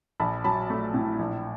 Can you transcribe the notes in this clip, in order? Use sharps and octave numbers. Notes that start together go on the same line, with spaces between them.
A#1 A5 B5
F#3 A5 B5
A3
A2
A#1